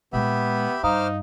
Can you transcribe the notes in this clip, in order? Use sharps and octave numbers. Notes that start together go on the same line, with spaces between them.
A#2 G#3 B3 G4 E5 F#5 B5
G2 D#4 C5 F5 A#5 D6 D#6 F6